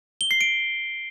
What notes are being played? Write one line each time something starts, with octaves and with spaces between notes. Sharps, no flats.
G7
C7
D7